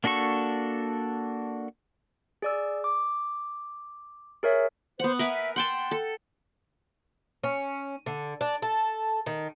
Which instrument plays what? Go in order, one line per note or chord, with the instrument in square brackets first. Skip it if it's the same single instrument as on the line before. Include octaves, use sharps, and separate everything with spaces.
[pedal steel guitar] A#3 D4 F#4 A4 C#6
[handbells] G#4 D5 E6
D6
G#4 A#4 C#5 E5
[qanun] B3 F#5 [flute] C5
[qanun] A#4 B4 G#5 [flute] E5
[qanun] F#5 G5 A5 [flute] C6
[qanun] A4
[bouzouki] C#4
D3
D4
A4
D#3